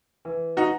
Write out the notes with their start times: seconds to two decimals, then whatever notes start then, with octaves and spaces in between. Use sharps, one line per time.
0.25 E3
0.57 D#4 F#4